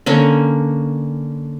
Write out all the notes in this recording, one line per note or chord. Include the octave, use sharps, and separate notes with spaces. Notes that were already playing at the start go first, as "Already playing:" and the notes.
D3 A#3 C#4